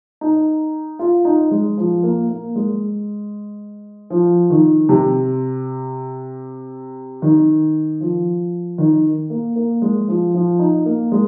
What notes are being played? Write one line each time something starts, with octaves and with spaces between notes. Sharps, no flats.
D#4
F4
D#4
G#3
F3
A#3
A#3
G#3
F3
D#3
C3
D#3
F3
D#3
A#3
A#3
G#3
F3
F3
D#4
A#3
G#3